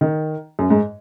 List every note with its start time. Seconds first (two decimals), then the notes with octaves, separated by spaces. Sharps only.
0.01 D#3
0.59 F#2
0.70 G#2